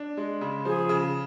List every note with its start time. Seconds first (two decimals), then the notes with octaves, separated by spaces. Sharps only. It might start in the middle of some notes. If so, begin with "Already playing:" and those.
Already playing: D4
0.17 G#3
0.41 C#3
0.65 F3 G#4
0.89 C#3